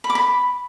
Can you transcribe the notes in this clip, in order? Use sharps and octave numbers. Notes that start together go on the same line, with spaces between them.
B5
D6
B5